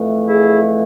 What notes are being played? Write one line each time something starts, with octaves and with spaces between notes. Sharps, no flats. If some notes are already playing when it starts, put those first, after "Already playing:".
Already playing: F2 E3 A3
E4 G#4